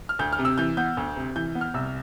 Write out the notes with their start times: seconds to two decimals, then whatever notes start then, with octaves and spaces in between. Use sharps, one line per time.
0.09 F6
0.19 D2 G6
0.33 F6
0.39 C3
0.45 E6
0.58 E3 G6
0.77 B3 G6
0.97 D2
1.16 C3
1.36 E3 G6
1.55 B3
1.61 F6
1.74 C2 E6